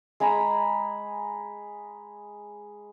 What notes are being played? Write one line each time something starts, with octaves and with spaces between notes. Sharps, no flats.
G#3 G#5 A#5 B5